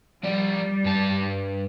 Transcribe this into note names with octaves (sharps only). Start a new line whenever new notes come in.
F3 G3 D5
G2 A5